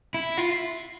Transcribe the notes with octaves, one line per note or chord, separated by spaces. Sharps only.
E4
F4